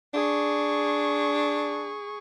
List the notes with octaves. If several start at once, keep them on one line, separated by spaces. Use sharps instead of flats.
D4 G#4 C#6